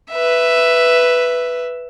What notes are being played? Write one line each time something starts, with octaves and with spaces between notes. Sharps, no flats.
B4 E5